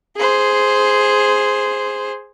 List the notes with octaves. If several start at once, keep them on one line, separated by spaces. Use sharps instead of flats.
G#4 C5